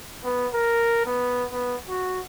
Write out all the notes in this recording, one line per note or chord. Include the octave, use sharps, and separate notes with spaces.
B3
A#4
B3
B3
F#4